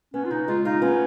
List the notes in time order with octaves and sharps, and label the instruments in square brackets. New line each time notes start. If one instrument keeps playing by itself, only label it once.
[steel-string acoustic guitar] B3 [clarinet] C#4
[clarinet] F4
[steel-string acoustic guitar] C#3 [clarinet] D#4
[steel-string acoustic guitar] G#3 [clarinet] F4
[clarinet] D#4 [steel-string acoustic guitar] F4
[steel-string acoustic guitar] B3 [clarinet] C#4